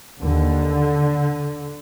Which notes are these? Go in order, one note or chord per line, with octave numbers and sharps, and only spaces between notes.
D#2 D3